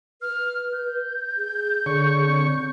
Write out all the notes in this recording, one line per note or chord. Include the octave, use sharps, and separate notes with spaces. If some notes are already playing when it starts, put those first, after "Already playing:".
B4 F6
G6
G#4
D3 C#5 C#6
C4